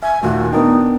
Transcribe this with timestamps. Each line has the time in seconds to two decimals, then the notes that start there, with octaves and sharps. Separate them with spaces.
0.03 E5 G#5
0.23 D#2 A#2 A3 F#4
0.52 B3 D4 D#4 A#4 G5